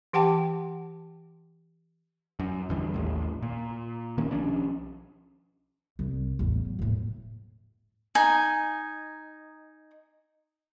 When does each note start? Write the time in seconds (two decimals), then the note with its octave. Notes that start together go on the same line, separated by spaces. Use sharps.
0.13 E3 G4 F#5 G5 A5 D6
2.39 F#2
2.69 F#1 E2 D3 G3
2.94 A1 D#2 A2
3.42 A#2
4.18 D#3 A#3 C#4
4.31 B1 F3 C#4 D4
5.99 C2 G3
6.39 A1 E2
6.65 F#3
6.79 D#1 A2
8.15 D#4 G#5